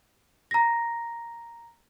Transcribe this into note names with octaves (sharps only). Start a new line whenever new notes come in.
A#5 A#6